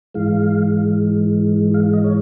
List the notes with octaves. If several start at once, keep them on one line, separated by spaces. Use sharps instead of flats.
G#2 E3 G#3 F5
F5
D#5
C#5